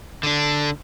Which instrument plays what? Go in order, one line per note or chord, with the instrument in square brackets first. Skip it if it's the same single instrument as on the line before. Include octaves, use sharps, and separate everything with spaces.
[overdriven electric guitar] D3 D4